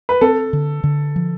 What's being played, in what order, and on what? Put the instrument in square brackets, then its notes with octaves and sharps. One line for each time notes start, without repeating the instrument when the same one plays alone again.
[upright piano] B4
[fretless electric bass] C4 [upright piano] A4
[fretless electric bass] D3
D3
F3